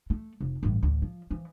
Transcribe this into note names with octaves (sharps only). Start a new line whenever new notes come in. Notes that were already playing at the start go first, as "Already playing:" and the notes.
A3
F1
A1 G2
A1 D2
F3
E3 F3